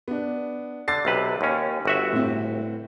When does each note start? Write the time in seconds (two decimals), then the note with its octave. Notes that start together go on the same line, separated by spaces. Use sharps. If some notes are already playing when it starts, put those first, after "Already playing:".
0.08 B3 D4
0.88 D3 A6 C7
1.05 B1 C3 B4
1.41 D#2 C#4
1.85 G1 F#4 E5
2.13 A2 C4